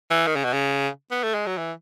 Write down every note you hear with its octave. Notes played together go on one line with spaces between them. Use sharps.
E3
D#3
C#3
B2
C#3
B3
A3
G#3
F#3
E3